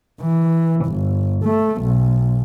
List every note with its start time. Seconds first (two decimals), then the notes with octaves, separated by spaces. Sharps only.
0.21 E3
0.86 G1
1.44 A3
1.82 B1